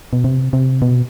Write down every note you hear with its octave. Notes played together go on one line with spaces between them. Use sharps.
B2
C3
C3
B2